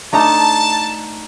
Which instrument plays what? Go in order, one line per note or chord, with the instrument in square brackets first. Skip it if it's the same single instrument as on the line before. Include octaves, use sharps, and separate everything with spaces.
[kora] A3 D4 D#4 [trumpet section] A5